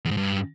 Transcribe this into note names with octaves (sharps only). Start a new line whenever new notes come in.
E2
G#2
G2